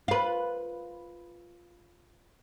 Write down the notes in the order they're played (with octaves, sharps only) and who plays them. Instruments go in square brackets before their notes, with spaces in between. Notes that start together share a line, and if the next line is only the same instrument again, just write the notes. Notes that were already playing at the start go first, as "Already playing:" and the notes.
[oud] F4 B4